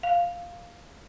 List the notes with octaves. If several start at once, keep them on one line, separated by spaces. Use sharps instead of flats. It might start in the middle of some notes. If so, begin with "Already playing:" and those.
F5